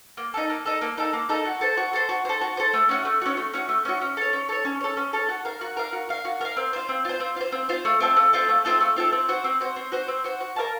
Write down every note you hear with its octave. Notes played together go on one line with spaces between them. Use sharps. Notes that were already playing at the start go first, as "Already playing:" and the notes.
A#3
D#4 A4
A#3
D#4 A4
A#3
D#4 A4
A#3
D#4 A4
F#4
A4 C5
F#4
A4 C5
F#4
A4 C5
F#4
A4 C5
A3
C#4 F#4
A3
C#4 F#4
A3
C#4 F#4
A3
C#4 F#4
C#4
A4 C#5
C#4
A4 C#5
C#4
A4 C#5
C#4
A4 C#5
F#4
A#4 F5
F#4
A#4 F5
F#4
A#4 F5
F#4
A#4 F5
C4
F4 C5
C4
F4 C5
C4
F4 C5
C4
F4 C5
A3
C4 F4 A4
A3
C4 F4 A4
A3
C4 F4 A4
A3
C4 F4 A4
C4
F#4 C5
C4
F#4 C5
C4
F#4 C5
C4
F#4 C5
F#4
A#4 F5 A5